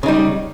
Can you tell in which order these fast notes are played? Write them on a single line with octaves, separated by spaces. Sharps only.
C#3 D#4 G3